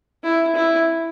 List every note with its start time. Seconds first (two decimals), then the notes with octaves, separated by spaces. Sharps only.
0.24 E4
0.55 E4